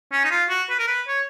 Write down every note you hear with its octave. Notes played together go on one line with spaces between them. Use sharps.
C#4
D#4
F4
F#4
B4
A#4
B4
C#5